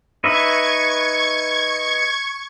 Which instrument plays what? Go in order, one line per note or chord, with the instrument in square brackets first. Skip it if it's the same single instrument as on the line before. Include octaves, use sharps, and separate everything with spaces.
[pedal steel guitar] D#4 B4 E5 [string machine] C#6 G#6